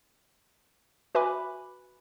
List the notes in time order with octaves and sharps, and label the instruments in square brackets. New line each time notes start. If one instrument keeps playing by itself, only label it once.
[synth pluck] F#4 B4 E5 G#5 B5 D6